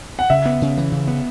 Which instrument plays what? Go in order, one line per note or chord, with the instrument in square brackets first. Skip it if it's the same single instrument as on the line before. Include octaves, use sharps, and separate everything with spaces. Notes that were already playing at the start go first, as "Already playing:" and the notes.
[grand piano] F#5
[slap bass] C#3 [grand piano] E5
[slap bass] B3
C#3
E3
C#3
B3